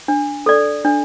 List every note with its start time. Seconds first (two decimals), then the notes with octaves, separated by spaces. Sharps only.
0.08 D4
0.46 A4 D5
0.85 D4